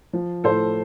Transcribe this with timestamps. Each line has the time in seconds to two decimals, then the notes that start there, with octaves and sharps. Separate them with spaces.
0.13 F3
0.44 A2 A4 C5